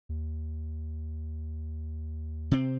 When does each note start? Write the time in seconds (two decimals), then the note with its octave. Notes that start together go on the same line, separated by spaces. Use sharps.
0.09 D#2
2.51 C3 C4